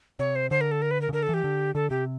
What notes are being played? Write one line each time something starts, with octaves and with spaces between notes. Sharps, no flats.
C3 C#5
C5
D3 C5
A#4
A4
A#4
B4
A#4
C#3
D3 A#4
A4
E3 G4
D3
D3 A4
C3 G4